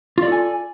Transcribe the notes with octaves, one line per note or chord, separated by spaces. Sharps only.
F4 A4 D5 G#5